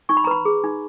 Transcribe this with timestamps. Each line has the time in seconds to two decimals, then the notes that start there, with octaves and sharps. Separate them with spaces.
0.09 D#4 C#6
0.17 B5
0.24 A#5
0.27 B4 B5
0.45 G#4
0.64 D#4